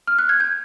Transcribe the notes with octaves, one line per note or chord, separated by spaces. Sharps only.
F6
F#6
G#6
G6